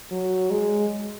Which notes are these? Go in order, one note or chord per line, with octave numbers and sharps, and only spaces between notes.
F#3
G#3